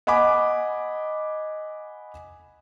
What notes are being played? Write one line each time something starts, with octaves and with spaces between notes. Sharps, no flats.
D#5 F#5 G#5 B5 D6